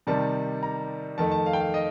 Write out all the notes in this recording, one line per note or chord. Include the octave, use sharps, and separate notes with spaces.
C3 D#3 G3 A5
A#5
F2 D#3 A3 A5
A5
F5
G5
F5
D#5